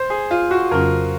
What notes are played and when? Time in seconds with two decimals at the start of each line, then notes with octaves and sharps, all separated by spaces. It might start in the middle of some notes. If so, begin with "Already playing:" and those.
Already playing: C5
0.10 G#4
0.31 F4
0.51 F#4
0.71 F2 C#3 F#3 C#4 F4 A#4